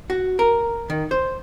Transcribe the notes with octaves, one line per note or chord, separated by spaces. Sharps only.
F#4
A#4
D#3
C5